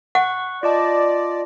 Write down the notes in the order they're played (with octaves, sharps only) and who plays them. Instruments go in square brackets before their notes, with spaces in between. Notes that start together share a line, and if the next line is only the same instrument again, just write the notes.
[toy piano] F#5 [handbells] C#6 F#6
[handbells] F4 D#5 A5 [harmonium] D5